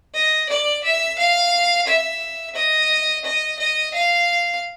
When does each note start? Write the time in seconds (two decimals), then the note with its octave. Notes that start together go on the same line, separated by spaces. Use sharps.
0.14 D#5
0.49 D5
0.83 E5
1.18 F5
1.87 E5
2.55 D#5
3.24 D#5
3.59 D#5
3.94 F5